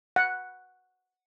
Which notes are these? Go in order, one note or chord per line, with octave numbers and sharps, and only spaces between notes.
F#5